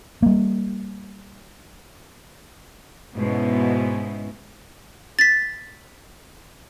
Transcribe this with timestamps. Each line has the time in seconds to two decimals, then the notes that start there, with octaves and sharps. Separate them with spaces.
0.22 G3 A#3
3.15 G#2 B2 G#3 B3 C#4 E4
5.19 A6 B6